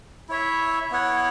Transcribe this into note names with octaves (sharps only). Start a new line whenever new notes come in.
E4 C#5 E5
B3 E4 C#5 F#5